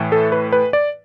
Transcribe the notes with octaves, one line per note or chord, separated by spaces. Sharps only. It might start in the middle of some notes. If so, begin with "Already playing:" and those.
Already playing: A2 E3 A3
A4
B4
B4
D5